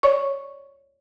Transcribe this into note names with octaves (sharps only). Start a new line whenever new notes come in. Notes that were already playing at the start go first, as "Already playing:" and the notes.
C#5 D5 C#6